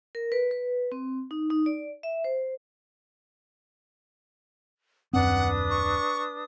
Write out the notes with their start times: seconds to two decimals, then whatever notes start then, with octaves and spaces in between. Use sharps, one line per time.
0.15 A#4
0.32 B4
0.51 B4
0.92 C4
1.31 D#4
1.51 D#4
1.66 D5
2.03 E5
2.24 C5
5.13 D#1 F#2 C4 D4 B4 F#5 D#6
5.71 C#6